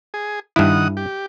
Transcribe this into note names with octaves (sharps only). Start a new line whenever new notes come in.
G#4
G2 D#3 E4 F#5 D#6
G4